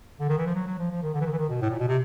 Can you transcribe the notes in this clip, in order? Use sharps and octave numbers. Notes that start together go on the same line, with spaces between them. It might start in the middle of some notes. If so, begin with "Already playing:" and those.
D3
D#3
E3
F3
F#3
F#3
F3
F3
D#3
D3
E3
D#3
E3
D#3
B2
A2
A#2
B2
C3